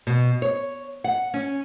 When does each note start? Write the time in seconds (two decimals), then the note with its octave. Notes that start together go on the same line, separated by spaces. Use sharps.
0.07 B2
0.42 C#5
1.04 F#5
1.34 C#4